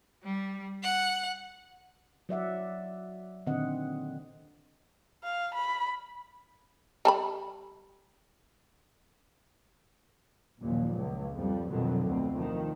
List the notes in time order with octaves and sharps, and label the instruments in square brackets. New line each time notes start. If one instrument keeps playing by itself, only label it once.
[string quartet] G3
F#5
[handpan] F#3 D5 E5 F#5
A#2 D3 D#3 C4 D#5 F#5
[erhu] F5
B5
[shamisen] G3 A5 B5
[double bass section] F#1 D#2 A#2 F3
C#2
F2 F3 G3
B1 F2 B2 D3 D#3 F#3
D2 B2 C4
D#3 F3